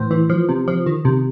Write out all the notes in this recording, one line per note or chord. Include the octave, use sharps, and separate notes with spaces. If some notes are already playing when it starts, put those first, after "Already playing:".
Already playing: A2 E3 C5
E3
F3
C3
F3
D#3
C3